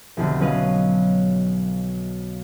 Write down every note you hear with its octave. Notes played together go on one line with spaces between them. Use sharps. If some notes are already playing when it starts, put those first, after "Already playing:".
F1 B1 D3
F#3 C#4 B4 D#5 F5